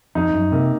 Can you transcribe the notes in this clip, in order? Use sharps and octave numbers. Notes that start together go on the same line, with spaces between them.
F2 D#4
F#2
C3 A#3